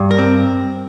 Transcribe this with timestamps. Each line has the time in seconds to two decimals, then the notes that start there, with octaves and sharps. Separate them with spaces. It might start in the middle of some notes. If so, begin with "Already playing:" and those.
Already playing: G2
0.11 A#4
0.19 C4